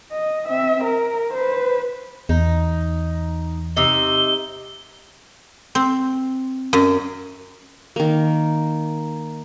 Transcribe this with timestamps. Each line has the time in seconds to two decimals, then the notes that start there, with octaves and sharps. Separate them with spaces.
0.11 D#5
0.47 C4 E5
0.84 A#4
1.34 B4 C5
2.29 E2 D#4
3.77 C3 D#4 G7
5.75 C4
6.73 F#2
7.96 D#3 A#3